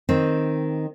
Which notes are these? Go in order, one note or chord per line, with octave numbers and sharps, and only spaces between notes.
D#3 C4